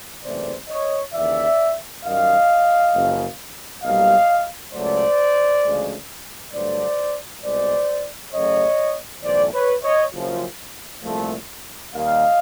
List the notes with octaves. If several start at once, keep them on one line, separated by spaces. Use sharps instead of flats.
F#1 E2 C3 E3 A3 C5 D5
C#5 D#5
D#2 C#3 E3 D5 E5
F#2 D#3 G3 D#5 F5
F#1 F#2 C#3 F3
B1 A#2 G3 D#5 F5
C#2 C#3 F#3 A3 C5 D5
D2 C#3 F3 G#3
G2 D3 F#3 A3 C5 D5
C2 B2 G#3 C5 D5
F#2 C#3 F#3 A3 C#5 D#5
B1 A2 E3 C5 D5
B4 C#5
C#5 D#5
F#1 F#2 C#3 F3
C2 A#2 F3 A3
D#2 D#3 G3 D#5 F5